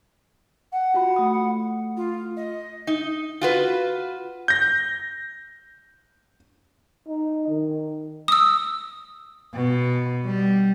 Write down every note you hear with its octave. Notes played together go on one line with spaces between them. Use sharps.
F#5
F4 F#4 B5
A3 D#6
F4
D#5
D#4
F4 F#4 B4
G6 A#6
D#4
D#3
D#6 E6
B2
G3